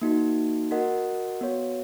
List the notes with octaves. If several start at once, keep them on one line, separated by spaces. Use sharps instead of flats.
A#3 D#4 F#4
F#4 A#4 D#5 F#5
B3 F#4 C#5